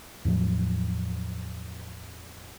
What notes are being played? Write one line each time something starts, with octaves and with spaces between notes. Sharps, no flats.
E2 A2 F3 F#3